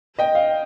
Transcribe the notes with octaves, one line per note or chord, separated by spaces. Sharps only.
D#5 G5
F5